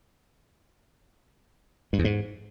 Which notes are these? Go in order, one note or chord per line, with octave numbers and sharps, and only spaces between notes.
G2
E2
G#2